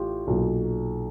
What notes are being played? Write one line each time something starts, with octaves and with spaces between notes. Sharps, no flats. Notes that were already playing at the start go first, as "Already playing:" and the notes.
Already playing: A1 F4 G4
B1 A#2 F#3